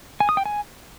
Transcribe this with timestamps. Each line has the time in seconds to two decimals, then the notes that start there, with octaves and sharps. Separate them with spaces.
0.20 G#5
0.29 D#6
0.37 G5
0.46 G#5